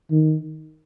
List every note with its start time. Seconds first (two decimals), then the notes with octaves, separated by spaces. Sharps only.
0.11 D#3